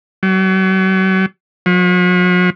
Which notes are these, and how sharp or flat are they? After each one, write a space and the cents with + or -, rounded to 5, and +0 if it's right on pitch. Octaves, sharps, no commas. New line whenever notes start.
F#3 +40
F#3 -45